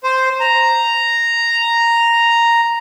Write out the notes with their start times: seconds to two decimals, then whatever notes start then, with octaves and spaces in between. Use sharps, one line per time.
0.04 C5
0.40 A#5